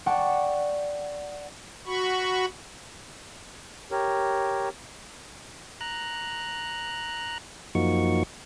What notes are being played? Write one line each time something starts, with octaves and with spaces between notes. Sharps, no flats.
D5 F#5 G5 A5 C#6
F#4 B5 C#6
G4 A#4 C#5
A#5 F#6
F#2 F3 A#3 D#4 F#4 C#6